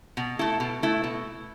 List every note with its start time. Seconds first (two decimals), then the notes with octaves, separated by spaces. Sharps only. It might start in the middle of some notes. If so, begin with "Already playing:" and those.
0.17 B2
0.39 A3 E4 A4
0.60 B2
0.82 A3 E4 A4
1.04 B2